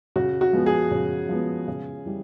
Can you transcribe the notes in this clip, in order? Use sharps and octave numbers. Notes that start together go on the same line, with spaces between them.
C#3 F#4
F#4
F3 G#3 B3
G#4
C#3
F3 G#3 B3
C#3
E3 G3